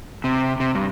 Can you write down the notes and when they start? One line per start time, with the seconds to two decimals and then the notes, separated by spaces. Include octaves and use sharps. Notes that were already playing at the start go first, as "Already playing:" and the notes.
0.24 C3
0.60 C3
0.75 G2